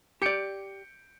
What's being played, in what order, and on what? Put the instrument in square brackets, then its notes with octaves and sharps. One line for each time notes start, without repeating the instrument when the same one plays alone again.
[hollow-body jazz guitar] G4 D5 [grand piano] G6 C#7 D7